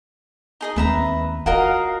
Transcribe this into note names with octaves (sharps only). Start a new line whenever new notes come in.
D#4 G#4 D#5
D#2 C4 B4 E5 A#5
F4 F#4 A#4 D#5 F5